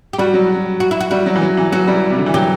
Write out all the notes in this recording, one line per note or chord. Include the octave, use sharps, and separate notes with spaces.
G4
G3 F#4
F#3
F#4
E4
F#4
G3 F#4
F#3
E3
F#3
E3
F#3 F#4
G3
C3
D3
E3
F#3 G4